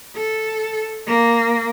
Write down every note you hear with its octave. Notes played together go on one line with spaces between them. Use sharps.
A4
A#3